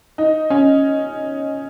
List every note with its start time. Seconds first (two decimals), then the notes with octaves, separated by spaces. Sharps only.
0.18 D#4
0.50 C#4